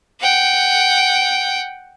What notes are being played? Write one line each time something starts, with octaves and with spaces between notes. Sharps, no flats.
F#5 G5